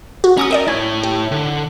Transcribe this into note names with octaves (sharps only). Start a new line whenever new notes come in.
F#4
C#4 A#5 D6 D#6
A#4 D5 D#5 G5
E4 C#5 G#5
G4
D3